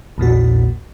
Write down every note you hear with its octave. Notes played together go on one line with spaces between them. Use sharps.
A#1 E2 A#2 F#4